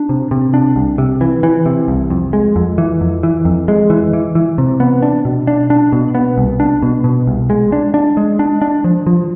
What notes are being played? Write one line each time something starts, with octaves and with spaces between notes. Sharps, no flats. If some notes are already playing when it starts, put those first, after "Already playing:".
Already playing: D4
C3
C3
D4
C2
C3
E3
E3
C3
C2
F2
G#3
F2
E3
F2
E3
F2
G#3
E3
E3
E3
C3
B3
D4
B2
D4
D4
B2
B3
C2
D4
B2
B2
C2
G#3
D4
D4
G#3
D4
D4
F3
F3